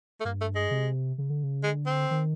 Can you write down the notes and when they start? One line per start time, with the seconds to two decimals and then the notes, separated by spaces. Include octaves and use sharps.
0.21 A3
0.25 G2 A#3
0.41 A3
0.55 G#3
0.71 C3
1.18 C#3
1.30 D3
1.43 C#3
1.63 D3 G#3
1.86 C4
2.11 D#3